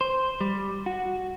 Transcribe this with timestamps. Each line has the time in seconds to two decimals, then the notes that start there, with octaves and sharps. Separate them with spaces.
0.01 C5
0.41 G3
0.86 F#4